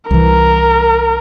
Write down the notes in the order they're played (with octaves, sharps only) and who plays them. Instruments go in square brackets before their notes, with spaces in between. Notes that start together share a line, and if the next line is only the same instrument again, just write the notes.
[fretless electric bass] C2 E3 [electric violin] A#4